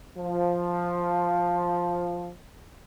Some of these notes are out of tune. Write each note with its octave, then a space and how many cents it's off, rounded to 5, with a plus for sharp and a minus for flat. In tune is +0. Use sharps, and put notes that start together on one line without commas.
F3 +5